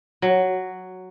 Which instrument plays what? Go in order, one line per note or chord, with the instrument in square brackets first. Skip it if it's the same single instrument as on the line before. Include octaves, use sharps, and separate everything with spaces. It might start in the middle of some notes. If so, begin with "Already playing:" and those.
[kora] F#3